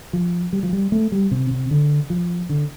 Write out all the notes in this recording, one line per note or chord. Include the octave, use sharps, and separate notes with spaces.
F3
G3
F3
G3
A3
G3
C3
C3
D3
F3
D3